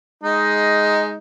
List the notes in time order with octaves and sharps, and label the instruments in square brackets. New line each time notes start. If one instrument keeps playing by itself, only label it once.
[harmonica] G#3 D#4